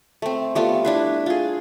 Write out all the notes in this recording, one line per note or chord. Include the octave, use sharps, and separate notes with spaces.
A3 C4
G3 A3 B3 F4
D4 E4 B4
F4 G#4